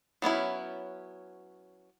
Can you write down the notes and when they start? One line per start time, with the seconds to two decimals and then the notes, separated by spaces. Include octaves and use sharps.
0.22 F#3 B3 C#4 E4